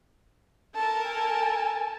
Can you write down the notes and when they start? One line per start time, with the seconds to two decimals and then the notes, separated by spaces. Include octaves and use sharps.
0.75 A4 A#4 A5
1.06 G#5 A5